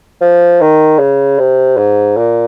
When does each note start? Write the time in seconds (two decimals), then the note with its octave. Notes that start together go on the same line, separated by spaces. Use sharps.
0.21 F3
0.61 D#3
0.99 C#3
1.39 C3
1.77 G#2
2.17 A#2